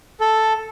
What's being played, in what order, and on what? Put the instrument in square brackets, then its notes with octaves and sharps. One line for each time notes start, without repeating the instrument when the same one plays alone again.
[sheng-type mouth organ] A4